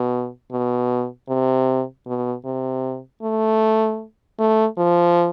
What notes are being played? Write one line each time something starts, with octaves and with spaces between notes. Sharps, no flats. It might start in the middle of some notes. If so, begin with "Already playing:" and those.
Already playing: B2
B2
C3
B2
C3
A3
A3
F3